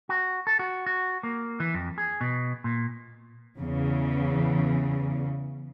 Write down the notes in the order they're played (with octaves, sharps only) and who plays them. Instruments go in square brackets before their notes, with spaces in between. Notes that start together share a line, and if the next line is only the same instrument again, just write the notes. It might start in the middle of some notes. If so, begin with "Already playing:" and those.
[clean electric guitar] F#4
A4
F#4
F#4
A#3
E3
F2
G#4
B2
A#2
[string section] E2 C#3